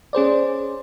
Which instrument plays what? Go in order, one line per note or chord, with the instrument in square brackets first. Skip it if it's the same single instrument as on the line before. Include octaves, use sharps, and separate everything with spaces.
[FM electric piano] C#4 G#4 C5 D5